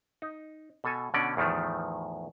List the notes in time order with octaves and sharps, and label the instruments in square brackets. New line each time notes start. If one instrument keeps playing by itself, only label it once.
[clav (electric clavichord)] D#4
B2 A4 G#5
B2 D3 C#4 D5
E2 A2 D#3 F3 A3